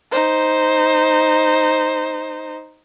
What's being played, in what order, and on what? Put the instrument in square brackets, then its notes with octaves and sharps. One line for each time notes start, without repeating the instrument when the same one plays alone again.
[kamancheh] D#4 C5